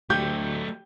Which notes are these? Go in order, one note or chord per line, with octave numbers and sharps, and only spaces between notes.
D2 F#3 A3 G4 G6